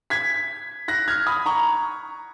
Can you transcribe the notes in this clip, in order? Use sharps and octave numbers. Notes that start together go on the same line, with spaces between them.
G#6 B6
F#6 A#6
F6 G#6
B5 D#6
A#5 C#6